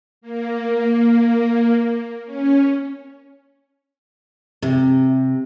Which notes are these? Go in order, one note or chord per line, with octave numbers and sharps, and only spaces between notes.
A#3
C#4
C3